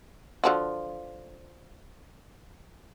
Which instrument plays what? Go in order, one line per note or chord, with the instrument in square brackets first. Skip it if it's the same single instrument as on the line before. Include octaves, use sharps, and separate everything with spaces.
[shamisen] D3 F3 F#4